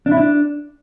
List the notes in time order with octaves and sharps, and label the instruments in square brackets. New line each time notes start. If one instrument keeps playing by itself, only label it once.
[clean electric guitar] D4
E4
D4